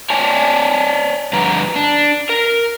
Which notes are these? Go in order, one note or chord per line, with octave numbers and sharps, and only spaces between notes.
C#5 D5 G#5 A5
G2 D3 F3 B4 A#5
D4
A#4